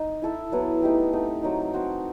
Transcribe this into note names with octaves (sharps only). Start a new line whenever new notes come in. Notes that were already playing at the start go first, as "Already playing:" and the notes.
Already playing: D#4 D#5
E4 A4 E5
F#3 B3 E4
A3 D#4 G4
A3 C4 D#4
F#3 C4 D#4
C4 F#4 C5